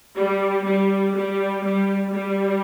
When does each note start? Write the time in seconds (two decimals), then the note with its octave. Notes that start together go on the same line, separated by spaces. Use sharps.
0.15 G3
0.64 G3
1.15 G3
1.64 G3
2.13 G3